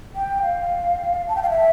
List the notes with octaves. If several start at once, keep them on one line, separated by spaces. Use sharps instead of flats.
G5
F5
A5
G5
F5
E5